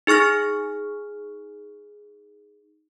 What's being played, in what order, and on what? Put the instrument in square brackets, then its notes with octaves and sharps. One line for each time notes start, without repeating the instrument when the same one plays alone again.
[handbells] D#4 G#4 C#6 F6 A#6